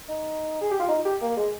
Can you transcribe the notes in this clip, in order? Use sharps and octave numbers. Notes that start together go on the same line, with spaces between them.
D#4
G#4
G4
F4
D#4
G4
A#3
G#3